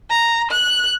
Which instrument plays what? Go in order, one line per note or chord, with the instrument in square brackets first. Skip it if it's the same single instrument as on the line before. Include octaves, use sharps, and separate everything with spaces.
[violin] A#5
F#6